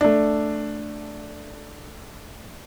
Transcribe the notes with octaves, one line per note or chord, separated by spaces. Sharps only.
A3 D4